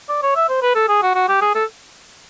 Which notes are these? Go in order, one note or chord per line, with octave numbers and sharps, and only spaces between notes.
D5
C#5
E5
C5
B4
A4
G#4
F#4
F#4
G4
G#4
A4